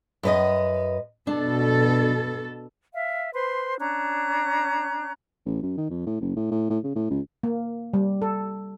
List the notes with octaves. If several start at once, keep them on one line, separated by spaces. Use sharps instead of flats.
F#2 B4 D#5
B2 D4 A4
E5 F5
B4 C5 C6
C#4 D4 A#5 F#6
A1
F#2
D#3
F2
A2
F#1
A2
A2
A2
C#3
A2
C#2
A#3
G3
A4